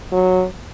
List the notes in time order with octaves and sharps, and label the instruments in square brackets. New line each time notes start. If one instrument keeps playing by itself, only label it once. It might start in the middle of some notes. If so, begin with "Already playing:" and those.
[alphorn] F#3